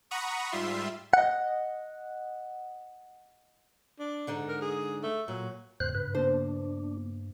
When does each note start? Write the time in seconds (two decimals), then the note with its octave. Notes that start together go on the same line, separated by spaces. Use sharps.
0.11 F#5 A#5 B5 C#6 D#6
0.52 G#2 G3 F4 E5 C6
1.13 D#5 F#5
4.00 D4
4.27 G#2 D3 D#4
4.49 A#4
4.61 G#4
5.03 A3
5.28 A#2 F#3
5.80 E2 G#2 C#3 C5 F#6
5.95 G2 B4
6.15 C#3 A#3 B3 D4 C5